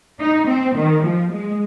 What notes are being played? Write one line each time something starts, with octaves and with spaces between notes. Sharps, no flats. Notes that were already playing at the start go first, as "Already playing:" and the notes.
D#4
C4
D#3
F3
G#3